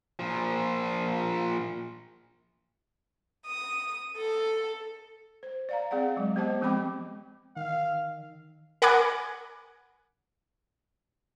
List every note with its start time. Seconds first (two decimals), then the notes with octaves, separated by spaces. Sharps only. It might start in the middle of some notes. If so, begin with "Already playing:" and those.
0.19 A#2 F3
3.46 D#6
4.16 A4
5.43 C5
5.69 D5 F5 A#5
5.91 C4 G#4 D5 F5 F#5
6.17 F#3 G#3
6.36 B3 G4 C5 D#5 A5
6.61 F3 G#3 C4 G5 B5 D6
7.56 D#3 F5
8.82 A#4 F#5 G#5 B5 D6 G#6